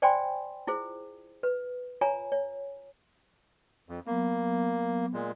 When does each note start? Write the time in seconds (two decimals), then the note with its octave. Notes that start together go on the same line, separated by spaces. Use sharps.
0.02 C5 D5 G5 G#5 B5 C6
0.67 E4 F4 G#4 C5
1.43 B4
2.01 F4 C#5 G#5 A#5
2.32 C#5
3.89 F2
4.07 F#3 A#3 B3
5.13 A#2 G#3